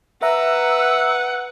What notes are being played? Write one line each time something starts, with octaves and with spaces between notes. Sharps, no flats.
B4 E5 F#5 A#5 E6